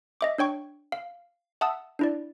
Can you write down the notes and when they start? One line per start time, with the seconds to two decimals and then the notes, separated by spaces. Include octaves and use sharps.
0.21 D#5 E5 D6
0.38 D4 C#5 G5 C#6
0.92 F5
1.61 E5 F#5 A5 D#6 E6
1.99 D4 E4 D5